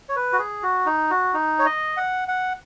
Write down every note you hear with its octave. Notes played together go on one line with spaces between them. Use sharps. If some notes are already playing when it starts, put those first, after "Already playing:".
C#5
B4
F#4
G#4
F#4
D#4
F#4
D#4
C#5
D#5
F#5
F#5